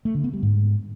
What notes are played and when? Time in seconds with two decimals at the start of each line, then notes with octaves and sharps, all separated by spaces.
0.05 A3
0.15 D3
0.24 B3
0.33 G3
0.43 G#2